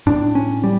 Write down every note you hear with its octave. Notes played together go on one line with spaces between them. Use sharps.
A2 D4
C#4
G3